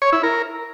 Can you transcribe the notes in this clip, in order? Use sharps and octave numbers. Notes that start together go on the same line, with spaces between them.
C#5
E4
A#4